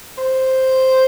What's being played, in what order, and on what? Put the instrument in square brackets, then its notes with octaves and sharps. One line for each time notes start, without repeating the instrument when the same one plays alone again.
[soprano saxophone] C5